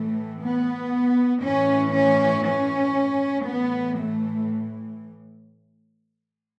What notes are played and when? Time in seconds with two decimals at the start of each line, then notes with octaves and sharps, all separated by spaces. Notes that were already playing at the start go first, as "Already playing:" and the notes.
Already playing: A2 E3 A3
0.43 B3
1.43 A2 E3 C#4
1.94 C#4
2.45 C#4
3.46 A2 E3 B3
3.98 A3